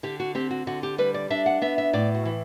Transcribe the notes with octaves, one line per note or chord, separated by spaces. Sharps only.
D3 G4
F#4
C4 G4
F#4
D3 F#4
G4
G3 B4
D5
D4 E5
F#5
B3 E5
E5
A2 D5
F#4
E3